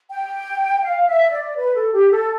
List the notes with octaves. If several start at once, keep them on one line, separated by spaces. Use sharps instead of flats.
G5
F5
E5
D5
B4
A4
G4
A4